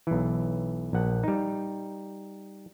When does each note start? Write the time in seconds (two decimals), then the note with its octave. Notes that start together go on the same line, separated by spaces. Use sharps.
0.07 B1 E3
0.93 A#1 F#5
1.24 G3 D#4